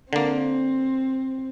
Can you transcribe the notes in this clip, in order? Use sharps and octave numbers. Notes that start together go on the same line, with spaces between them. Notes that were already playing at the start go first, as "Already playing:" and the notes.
D3 A#3 C4